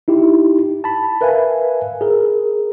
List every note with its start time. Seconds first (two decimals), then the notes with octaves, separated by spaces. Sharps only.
0.08 D#4 E4 G4
0.84 A5 B5
1.21 A#4 B4 E5 F5 G#5
2.01 G#4 A#4